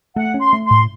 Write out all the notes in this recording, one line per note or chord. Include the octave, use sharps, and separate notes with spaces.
A3 F#5
C#4
C6
A3
C6
A2